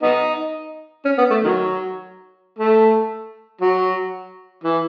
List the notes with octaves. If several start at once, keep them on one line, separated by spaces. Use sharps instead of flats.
B3 D#4
C#4
B3
A3
D#3 F#3
A3
F#3
E3